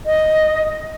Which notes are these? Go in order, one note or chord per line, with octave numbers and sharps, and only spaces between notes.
D#5